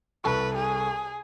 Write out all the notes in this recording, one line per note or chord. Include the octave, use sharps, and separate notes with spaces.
C2 A4 B4 C#6
G#4